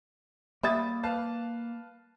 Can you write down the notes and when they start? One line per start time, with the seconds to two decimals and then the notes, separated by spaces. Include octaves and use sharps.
0.63 G3 A#3 E5 B5 D#6 A6
1.03 B4 F5 A5